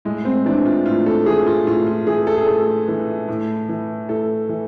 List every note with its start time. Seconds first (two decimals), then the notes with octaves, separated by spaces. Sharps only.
0.05 A2 G#3
0.25 C4
0.45 E3 D4
0.65 F4
0.86 A2 F4
1.06 A4
1.26 E3 G#4
1.47 F4
1.67 A2 F4
1.87 F4
2.07 E3 G#4
2.27 A4
2.36 G#4
2.46 A2 A4
2.88 E3
3.28 A2
3.69 E3
4.09 A2 A4
4.49 E3